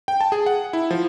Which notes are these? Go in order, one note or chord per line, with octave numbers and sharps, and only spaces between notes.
G5
A5
G#4
F#5
E4
F3